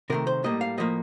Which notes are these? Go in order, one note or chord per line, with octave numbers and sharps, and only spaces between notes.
C3 D#3 A3 A#4
C5
A2 G3 A#3 D#5
F5
A2 F3 A#3 D#5